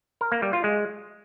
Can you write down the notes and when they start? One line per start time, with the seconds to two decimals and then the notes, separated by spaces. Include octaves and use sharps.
0.21 A#4
0.32 A#3
0.42 G3
0.53 F4
0.64 G#3